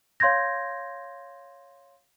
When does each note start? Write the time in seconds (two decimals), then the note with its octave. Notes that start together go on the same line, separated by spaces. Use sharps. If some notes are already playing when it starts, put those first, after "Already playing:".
0.20 C#5 F5 C6 G6 G#6 A#6